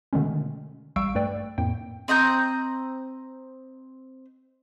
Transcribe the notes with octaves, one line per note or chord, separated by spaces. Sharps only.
B2 D3 D#3 G#3 A3 C#4
A1 G3 F5 C#6 E6 D7
G2 A3 B4 D5 G5
F2 A2 A#3 G5
C4 D#5 A#5 G6